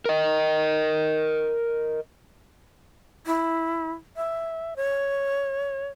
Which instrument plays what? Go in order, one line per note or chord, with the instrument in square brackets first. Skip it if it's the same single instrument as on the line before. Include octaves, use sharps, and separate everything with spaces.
[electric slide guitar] A#4 D#5
[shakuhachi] E4
E5
C#5